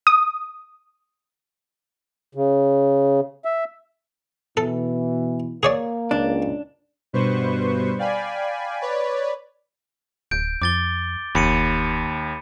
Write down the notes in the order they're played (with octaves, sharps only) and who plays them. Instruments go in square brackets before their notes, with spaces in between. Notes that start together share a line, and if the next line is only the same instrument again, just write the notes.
[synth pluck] D#6
[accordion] C#3
E5
[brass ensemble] B2 E3 [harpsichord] A4
[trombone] A#3 [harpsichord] G#4 C#5 D5
[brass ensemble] C#2 [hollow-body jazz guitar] D4
[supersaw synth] G2 B2 B4 C5 C#6
D5 F5 G5 G#5 B5
B4 C#5 D5 B5
[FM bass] D1 [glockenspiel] G6 D7
[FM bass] F2 [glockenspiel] D6 A6 G7
[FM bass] F1 [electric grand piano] D#2 [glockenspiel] B5 C#7 D#7